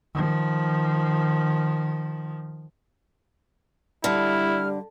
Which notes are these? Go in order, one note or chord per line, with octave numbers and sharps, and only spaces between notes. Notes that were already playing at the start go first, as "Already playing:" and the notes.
D#3 F3
D3 G3 E4 F6